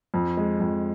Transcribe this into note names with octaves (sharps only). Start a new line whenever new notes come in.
F2
G#3
F2